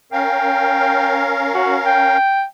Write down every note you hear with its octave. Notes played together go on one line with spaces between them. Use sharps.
C#4 A#4 F5 G5
F#4
G5